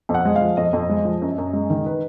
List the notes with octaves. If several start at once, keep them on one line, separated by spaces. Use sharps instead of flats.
F2
F#5
G#3
F5
F3
F2 D#5
F2
G#3
F3
F#2
F#2
G#3
D#3
B4